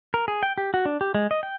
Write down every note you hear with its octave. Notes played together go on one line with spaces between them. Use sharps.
A#4
G#4
G5
G4
F#4
D4
G4
G#3
D#5
G5